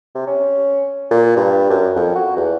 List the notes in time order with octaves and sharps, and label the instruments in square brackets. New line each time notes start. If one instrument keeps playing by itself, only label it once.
[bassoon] C3
C#4
A#2
G2
F#2
F2
F#4
E2